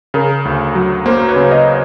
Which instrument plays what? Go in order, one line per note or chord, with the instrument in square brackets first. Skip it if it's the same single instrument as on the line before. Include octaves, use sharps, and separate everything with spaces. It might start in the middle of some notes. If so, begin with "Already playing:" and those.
[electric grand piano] C#3 [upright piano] G#4 A#4
[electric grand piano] D2
F#3
[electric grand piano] A#3 [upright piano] A#4 C5
[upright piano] B4 C#5
[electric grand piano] C#3
[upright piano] D#5 F5